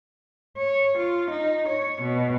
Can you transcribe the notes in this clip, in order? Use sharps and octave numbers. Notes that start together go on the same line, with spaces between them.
C#5
F4
D#4
C#5
B2